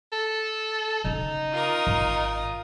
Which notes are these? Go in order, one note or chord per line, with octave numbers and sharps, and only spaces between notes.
A4
C#3 C#4 D#4
F4 A#4 D#6
G#1